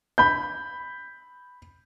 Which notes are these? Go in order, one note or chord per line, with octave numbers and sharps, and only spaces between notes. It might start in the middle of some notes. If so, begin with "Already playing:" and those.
B5 G6